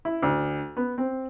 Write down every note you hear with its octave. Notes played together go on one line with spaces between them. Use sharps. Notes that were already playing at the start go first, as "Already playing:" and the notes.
E4
D2
B3
C4